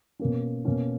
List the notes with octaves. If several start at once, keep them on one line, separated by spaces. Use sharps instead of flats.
B2 A#3 C#4
B2 A#3 C#4